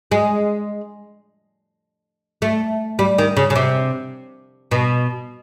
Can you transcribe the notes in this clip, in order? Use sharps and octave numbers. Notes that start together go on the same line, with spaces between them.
G#3
A3
G3
D#3
C#3
C#3
C3
B2